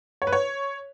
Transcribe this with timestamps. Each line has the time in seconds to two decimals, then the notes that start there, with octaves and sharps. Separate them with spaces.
0.22 C#5
0.27 B4
0.32 C#5